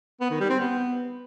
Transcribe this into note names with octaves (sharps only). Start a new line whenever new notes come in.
B3
D#3
G3
C4
B3